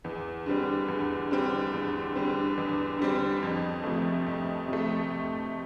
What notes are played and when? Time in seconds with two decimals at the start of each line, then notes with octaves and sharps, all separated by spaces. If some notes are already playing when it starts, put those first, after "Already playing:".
0.04 E2
0.46 D3 G3 C4
0.88 E2
1.31 D3 G3 C4
1.73 E2
2.15 D3 G3 C4
2.57 E2
2.99 D3 G3 C4
3.43 F2
3.84 C3 F3 A3
4.27 F2
4.68 C3 F3 A3
5.10 F2